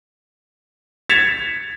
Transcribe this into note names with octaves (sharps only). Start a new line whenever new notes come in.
G#6 A6 B6 C#7 E7 F7